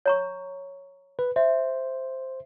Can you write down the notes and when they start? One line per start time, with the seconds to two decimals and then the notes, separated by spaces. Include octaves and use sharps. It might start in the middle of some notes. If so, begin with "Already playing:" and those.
0.06 C#5 A#5 C#6
1.19 B4
1.36 C5 E5